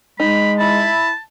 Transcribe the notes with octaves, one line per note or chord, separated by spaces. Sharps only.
G#3 D#4 B5
E4 A5 B5